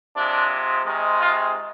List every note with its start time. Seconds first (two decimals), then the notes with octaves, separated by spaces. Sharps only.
0.16 C3 F3 G#3 D4
0.86 C3 D#3 G#3
1.20 F4